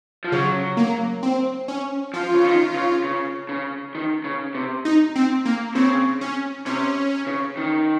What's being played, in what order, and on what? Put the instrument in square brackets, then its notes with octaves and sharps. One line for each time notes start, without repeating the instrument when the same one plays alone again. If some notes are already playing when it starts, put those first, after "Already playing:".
[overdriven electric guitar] F3
[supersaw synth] C#3 [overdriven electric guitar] F#3
[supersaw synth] A#3
C4
C#4
[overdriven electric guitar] F3 [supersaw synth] F4
[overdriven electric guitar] C#3
D#3
C#3
C#3
C#3
D#3
C#3
C3
[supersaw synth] D#4
C4
A#3
[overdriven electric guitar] C#3 [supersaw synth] C4
[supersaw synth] C#4
[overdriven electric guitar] C3 [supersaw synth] C#4
[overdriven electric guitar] C#3
D#3